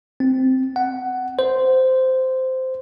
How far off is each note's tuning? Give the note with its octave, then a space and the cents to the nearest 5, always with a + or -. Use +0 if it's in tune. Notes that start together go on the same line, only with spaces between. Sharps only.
C4 -5
F#5 +10
C5 -10